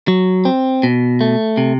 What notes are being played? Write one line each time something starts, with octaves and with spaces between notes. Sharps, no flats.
F#3
C4
B2
A3
C3